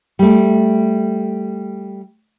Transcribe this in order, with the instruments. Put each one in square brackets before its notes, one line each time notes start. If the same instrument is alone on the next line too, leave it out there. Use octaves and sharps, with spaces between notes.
[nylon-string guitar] G3 A3